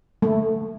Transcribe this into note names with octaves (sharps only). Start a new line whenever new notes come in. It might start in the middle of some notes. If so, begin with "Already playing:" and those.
A3